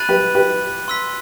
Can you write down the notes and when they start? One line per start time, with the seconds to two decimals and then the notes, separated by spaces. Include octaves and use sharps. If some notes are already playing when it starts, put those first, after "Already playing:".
Already playing: B5 F#6 A6 D#7 F#7
0.09 G4 B4
0.35 G4 B4
0.88 C6 E6 B6